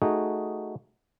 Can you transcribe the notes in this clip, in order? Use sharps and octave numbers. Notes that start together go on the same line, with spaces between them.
A3 D#4 F#4 G#4